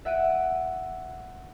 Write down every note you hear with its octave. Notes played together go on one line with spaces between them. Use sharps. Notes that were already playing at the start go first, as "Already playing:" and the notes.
E5 F#5 D7 D#7